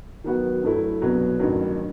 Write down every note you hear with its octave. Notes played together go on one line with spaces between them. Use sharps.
D#3 F#3 B3 F#4
G2 F#3 A3 E4
C2 B2 F#3 B3
A1 G2 D#3 F#3